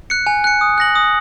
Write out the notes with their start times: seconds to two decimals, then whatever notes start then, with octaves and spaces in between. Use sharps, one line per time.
0.10 F#6 C#7
0.27 G#5
0.44 F#6 C#7
0.61 D#6
0.78 F#6 A#6 F#7
0.96 D#6